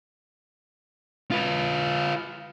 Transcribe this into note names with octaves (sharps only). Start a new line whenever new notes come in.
F4 B4